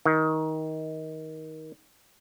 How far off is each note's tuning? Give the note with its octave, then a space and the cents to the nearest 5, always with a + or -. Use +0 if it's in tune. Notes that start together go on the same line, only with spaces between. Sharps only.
D#3 +20